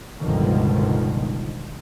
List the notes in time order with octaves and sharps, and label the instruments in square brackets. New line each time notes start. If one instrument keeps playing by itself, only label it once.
[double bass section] G1 C#2 B2 D3 D#3 F3